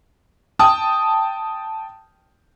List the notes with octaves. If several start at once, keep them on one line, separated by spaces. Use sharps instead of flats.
G5 A5 D#6